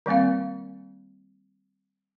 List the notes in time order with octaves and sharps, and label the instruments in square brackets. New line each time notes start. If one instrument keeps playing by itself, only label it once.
[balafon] D#3 G3 A#3 C4 F5